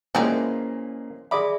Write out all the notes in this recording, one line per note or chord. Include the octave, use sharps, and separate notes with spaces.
A#2 E3 F3 G#3 A#3 C4 C#4
G#4 D5 E5 B5 D6 D#6